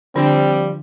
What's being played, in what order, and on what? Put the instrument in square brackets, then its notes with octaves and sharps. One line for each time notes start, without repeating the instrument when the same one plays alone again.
[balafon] D3 D4 [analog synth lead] F3 [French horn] G3 [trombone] C4